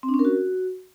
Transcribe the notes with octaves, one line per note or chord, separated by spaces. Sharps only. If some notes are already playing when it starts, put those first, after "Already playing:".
C4
D4
C#4
A#4
F#4